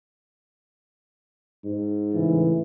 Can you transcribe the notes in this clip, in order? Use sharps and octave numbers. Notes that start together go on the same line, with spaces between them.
G#2
A2 C#3 E3